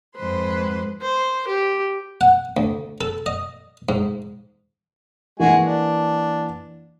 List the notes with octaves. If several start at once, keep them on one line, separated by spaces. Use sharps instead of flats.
F2 G#2 B4 C5 C6
C5
G4
F#5
D2
A4
D#5
G#2
E3 G#3 A#3 F#4 F#5 G#5
D4